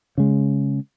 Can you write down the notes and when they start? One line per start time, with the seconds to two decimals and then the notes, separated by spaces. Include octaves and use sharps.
0.18 C#3 G#3